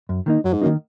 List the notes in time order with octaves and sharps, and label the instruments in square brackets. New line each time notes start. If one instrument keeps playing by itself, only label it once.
[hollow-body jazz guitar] F#2
D#3 A#3 D#4
[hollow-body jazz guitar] F#2 [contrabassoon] F#3
[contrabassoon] G#2
[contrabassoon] F#2 [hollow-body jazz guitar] D#3 A#3 D#4